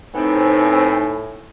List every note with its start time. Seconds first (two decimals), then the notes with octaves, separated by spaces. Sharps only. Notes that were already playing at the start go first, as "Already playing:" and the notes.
0.14 A2 B3 C4 D#4 G#5